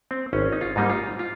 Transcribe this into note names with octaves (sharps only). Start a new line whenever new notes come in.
C4
G#1 C#4
D#4
F4
G#2 G3 A#3 D#4
F4
F4